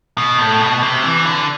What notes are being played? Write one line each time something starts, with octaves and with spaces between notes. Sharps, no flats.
B2
A2
B2
C3
E3
D3